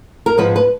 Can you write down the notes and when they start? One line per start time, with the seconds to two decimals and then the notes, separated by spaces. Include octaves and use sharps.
0.26 A#4
0.38 G#2 F3 G#3 B3 B4
0.56 B4